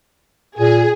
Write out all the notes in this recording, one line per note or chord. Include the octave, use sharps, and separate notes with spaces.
A#2 G#4